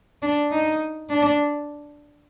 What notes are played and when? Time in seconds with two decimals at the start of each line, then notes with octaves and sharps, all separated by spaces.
0.22 D4
0.51 D#4
1.09 D4